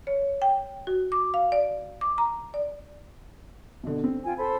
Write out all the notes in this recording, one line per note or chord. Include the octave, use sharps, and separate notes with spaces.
C#5
G5
F#4
D6
F5
D5
D6
A#5
D5
B2 D3
C4
F4 G5 G#5
A4 C5 B5